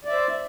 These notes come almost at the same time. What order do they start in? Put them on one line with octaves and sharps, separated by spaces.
D5 E5 C5